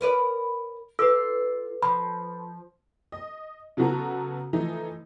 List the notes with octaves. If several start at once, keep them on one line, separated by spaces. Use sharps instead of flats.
A#4 B4 D5
F4 A4 B4 E6
F3 B5
D#5
C#3 F#3 B3 F#4 A4 A#5
E3 F3 A3 D#4